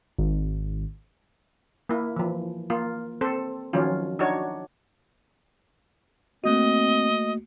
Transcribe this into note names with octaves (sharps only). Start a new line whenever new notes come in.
G#1
A#3 E4
E3 F3
A#3 F4
C4 A4 C5
D#3 F3 F#3 C#4 F4
D4 D#4 F#4 C#5
A3 A#3 C4 F#4 D#5